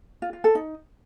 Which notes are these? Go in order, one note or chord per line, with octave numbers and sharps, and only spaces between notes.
F4
F4
A4
D#4